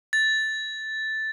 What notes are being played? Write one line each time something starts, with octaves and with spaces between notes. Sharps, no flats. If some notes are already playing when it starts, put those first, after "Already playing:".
A6